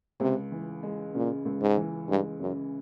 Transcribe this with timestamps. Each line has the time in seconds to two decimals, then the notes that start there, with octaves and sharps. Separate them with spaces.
0.20 C#2 C3
0.52 E3
0.83 G#3
1.14 A#2 C#3
1.45 C#2
1.62 G#2
1.77 E3
2.09 G2 G#3
2.40 F#2 C#3